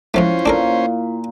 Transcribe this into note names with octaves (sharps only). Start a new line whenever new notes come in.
G#2 F3 A3 C#4 E4 F4 C5 F5
A#2 D4 A4 A#4